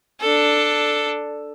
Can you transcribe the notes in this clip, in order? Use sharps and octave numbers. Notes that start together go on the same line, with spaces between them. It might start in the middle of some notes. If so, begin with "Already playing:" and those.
D4 A4